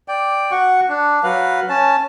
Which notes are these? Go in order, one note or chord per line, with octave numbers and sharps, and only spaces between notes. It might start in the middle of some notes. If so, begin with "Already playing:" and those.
D5 G5
F#4 F#5 C#6
D4
F#3 B4 F5
C#4 A5